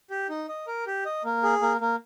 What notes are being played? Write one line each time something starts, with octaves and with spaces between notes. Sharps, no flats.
G4
D#4
D#5
A#4
G4
D#5
A#3
G#4
A#3
A#3